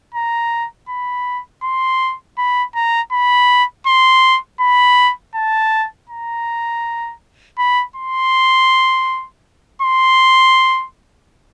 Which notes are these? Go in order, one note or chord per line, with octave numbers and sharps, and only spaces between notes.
A#5
B5
C6
B5
A#5
B5
C6
B5
A5
A#5
B5
C6
C6